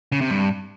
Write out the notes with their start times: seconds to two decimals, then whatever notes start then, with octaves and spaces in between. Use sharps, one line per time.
0.12 C#3
0.21 C3
0.30 G2